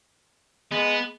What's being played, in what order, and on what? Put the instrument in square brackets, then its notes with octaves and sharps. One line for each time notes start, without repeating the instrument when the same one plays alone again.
[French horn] G#3 [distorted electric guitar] B3